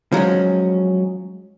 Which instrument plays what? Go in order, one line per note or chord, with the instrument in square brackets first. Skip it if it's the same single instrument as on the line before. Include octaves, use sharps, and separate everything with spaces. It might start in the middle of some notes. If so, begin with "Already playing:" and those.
[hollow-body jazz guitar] F3 F#3 G#3 C#4